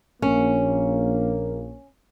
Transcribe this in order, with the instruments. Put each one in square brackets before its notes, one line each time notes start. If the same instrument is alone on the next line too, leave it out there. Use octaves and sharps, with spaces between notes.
[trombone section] A#1 A#3 [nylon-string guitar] C#4